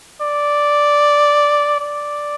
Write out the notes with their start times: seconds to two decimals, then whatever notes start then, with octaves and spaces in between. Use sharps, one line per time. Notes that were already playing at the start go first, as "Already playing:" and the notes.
0.21 D5
1.79 D5